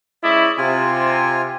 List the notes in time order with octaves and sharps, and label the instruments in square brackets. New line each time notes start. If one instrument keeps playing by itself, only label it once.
[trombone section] G#3 C#4 E4 [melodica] D5 D#5
[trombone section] C3 [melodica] F4 G#5